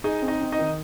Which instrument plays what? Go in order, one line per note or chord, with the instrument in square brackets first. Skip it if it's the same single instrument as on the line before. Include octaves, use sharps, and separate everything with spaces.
[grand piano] D#4 D#5 [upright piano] G#4
[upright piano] C4
[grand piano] D#4 D#5
[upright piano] C4
[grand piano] D#4 D#5
[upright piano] D#3